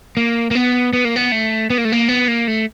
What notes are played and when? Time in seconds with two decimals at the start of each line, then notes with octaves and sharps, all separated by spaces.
0.17 A#3
0.51 A#3
0.55 B3
0.93 B3
1.05 A#3
1.16 B3
1.32 A3
1.70 B3
1.78 A#3
1.85 A3
1.92 A#3
2.09 B3
2.28 A#3
2.48 A3